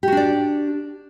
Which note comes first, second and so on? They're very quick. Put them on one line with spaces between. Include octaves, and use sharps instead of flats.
G4 F#4 D4 D5